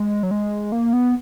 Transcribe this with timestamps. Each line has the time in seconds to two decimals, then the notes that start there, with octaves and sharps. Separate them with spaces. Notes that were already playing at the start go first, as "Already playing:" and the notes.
Already playing: G#3
0.23 F#3
0.31 G#3
0.72 A#3
0.93 B3